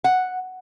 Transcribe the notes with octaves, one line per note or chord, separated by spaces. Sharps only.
F#5